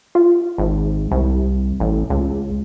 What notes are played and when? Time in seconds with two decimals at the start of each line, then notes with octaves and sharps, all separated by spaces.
0.15 F4
0.58 G#1
1.11 C2
1.80 A1
2.10 C#2